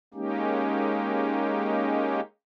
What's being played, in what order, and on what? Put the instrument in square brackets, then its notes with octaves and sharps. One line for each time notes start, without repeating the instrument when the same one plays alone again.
[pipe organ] G#3 A#3 C#4 D#4 G4